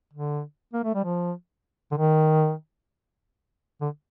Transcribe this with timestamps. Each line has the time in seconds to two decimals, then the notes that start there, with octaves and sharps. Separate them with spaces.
0.13 D3
0.73 A#3
0.84 A3
0.95 G3
1.04 F3
1.92 D3
1.97 D#3
3.81 D3